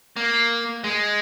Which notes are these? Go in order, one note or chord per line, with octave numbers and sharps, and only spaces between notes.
A#3
G#3